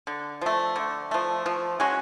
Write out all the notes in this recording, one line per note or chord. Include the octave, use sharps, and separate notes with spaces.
D3
F3 A3
D3
F3 A3
F3
G#3 C#4 F#4